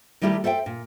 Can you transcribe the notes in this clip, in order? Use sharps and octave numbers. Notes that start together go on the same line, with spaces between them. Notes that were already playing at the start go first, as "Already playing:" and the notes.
D#3 G3 A3 E4 G4 A4
A4 C5 E5 F#5 G5
A#2